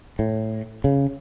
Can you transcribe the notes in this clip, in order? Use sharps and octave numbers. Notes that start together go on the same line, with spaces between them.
A2
C#3